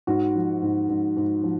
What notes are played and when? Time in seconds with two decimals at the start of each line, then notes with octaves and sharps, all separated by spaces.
0.07 G#2 F#4
0.35 F3
0.62 G#2
0.89 G#2
1.17 G#2
1.43 F3